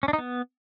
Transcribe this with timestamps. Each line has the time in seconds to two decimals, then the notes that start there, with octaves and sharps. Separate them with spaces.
0.03 C#4
0.08 D4
0.13 D#4
0.18 B3